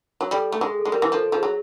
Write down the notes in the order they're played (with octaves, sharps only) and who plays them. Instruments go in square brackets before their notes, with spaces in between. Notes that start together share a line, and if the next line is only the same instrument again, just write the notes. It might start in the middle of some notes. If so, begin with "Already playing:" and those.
[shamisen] F#3
[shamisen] G3 [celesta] A4
[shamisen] A3
[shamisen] G#3 [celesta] G#4
[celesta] A4
[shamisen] G#3
[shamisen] G3 [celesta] A#4
[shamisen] E3
[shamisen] F3 [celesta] A4
[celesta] A4
[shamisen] F3 [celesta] G#4
[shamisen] F#3